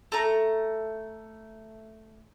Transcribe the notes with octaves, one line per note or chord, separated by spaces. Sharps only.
A3 A#5